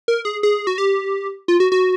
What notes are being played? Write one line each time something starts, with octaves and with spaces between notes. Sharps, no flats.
A#4
G#4
G#4
F#4
G4
F4
F#4
F#4